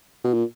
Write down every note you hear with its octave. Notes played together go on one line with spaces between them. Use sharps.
B2
A#2